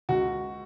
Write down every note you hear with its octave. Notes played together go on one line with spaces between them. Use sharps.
C#2 F#4